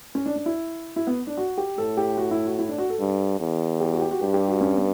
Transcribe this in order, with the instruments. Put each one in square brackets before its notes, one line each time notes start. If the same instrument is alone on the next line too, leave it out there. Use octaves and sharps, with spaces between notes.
[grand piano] C#4
D4
D4
E4
E4
B3
D4
F#4
G4
[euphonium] A2 [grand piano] A4
[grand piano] G4
F#4
E4
F#4
E4
D4
F#4
A4
[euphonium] G2
E2
[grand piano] G4
F#4
G4
F#4
[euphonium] G2 [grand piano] G4
[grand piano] G4
F#4
C#4
B3